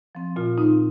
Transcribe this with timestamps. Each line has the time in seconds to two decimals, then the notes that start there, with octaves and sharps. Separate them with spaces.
0.15 F3 C4
0.36 A#2 F4
0.58 A3 C4 D#4